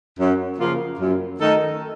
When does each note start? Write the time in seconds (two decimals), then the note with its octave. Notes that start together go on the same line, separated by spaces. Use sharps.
0.19 F#2
0.58 C#3 F3 A#3 F4
0.99 F#2
1.40 D#3 A3 D#4 A4